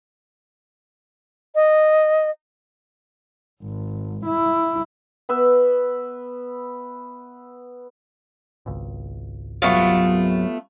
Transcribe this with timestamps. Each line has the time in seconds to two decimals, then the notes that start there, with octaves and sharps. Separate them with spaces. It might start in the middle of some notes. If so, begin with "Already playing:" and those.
1.55 D#5
3.63 G#1
4.26 E4
5.29 B3 B4 E5
8.66 G#1 C#2
9.62 F#2 C3 F#3 A3 B3 F4